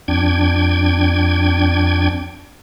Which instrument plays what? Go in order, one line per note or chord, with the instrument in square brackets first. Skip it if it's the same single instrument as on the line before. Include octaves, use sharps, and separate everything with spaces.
[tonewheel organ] F2 D4 G5 G#6